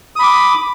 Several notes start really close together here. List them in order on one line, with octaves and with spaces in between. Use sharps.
D#6 B5 D6